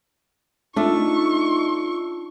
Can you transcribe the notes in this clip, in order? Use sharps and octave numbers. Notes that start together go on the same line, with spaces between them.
A3 D4 D#4 F4 C#6 E6